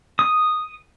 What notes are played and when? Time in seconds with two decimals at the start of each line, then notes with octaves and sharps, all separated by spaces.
0.19 D#6